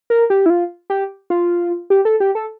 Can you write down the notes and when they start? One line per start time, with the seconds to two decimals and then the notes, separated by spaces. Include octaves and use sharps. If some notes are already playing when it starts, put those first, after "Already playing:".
0.10 A#4
0.30 G4
0.46 E4
0.50 F4
0.90 G4
1.30 F4
1.90 G4
2.05 A4
2.20 G4
2.35 A4